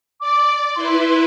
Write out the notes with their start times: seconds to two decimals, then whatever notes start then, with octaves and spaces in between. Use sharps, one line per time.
0.20 D5 D6
0.76 E4 B4 C6